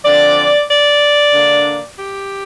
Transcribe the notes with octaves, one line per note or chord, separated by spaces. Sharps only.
D3 F3 C4 D5
D5
D3 A#3 D4
G4